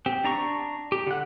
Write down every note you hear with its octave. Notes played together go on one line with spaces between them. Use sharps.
C4 G4
D4 A#5 C#6
G4
D3 F#5